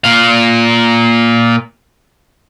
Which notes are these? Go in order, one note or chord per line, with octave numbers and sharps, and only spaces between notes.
A#2 F5